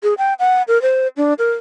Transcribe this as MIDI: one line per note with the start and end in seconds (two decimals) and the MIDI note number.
0.03 0.14 68
0.18 0.34 79
0.39 0.62 78
0.68 0.81 70
0.82 1.08 72
1.17 1.34 62
1.39 1.51 70